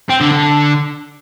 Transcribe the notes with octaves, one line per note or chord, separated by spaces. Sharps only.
C4
D3
D3